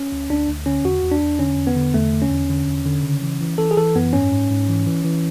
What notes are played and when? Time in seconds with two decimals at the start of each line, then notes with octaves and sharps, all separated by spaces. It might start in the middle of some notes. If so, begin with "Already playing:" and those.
Already playing: C#4
0.12 D2
0.30 D2 D4
0.48 D2
0.66 D3 C#4
0.84 E2 F#4
1.03 E2
1.11 D4
1.22 E2
1.39 D3 C#4
1.58 E2
1.67 B3
1.76 D3
1.94 E2 A3
2.12 D3
2.22 C#4
2.31 E2
2.49 D3
2.67 E2
2.86 D3
3.03 C#3
3.22 E3
3.41 E3
3.58 E3 A4
3.71 G#4
3.77 E3 A4
3.95 F#2 B3
4.13 G#2 C#4
4.32 G#2
4.50 G#2
4.68 E3
4.86 E3
5.05 E3